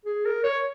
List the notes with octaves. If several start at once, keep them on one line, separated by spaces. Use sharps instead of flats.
G#4
A#4
C#5